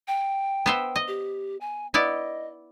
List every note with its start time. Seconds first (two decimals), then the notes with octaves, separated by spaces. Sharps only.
0.08 G5
0.66 B3 C5 E5
0.96 D#5
1.08 G4
1.61 G#5
1.94 B3 E4 D5 D#5